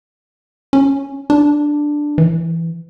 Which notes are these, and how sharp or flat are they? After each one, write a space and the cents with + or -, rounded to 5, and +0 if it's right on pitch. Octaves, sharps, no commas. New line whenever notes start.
C#4 +0
D4 +5
E3 +10